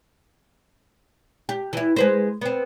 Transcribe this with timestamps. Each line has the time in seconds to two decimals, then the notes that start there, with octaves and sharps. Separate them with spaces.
1.49 G4
1.73 E3 E4
1.96 G#3 B4 C5
2.41 B3 C4